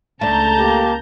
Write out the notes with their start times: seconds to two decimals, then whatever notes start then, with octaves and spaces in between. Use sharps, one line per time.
0.21 C#2 A3 D4 A5 A#5 G6
0.58 A#3 G4